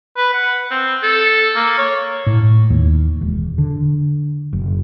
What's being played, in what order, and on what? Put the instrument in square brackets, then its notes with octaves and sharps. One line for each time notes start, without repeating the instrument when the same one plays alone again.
[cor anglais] B4
F#5
C4
A4
A#3
C#5
[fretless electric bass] A2
D#2
E1
D3
F#1